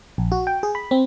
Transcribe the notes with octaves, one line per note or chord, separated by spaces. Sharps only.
A#1
F#4
G5
G#4
B5
C4